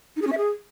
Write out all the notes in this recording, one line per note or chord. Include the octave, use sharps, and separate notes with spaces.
D#4
G#4
C#4
E5
G#4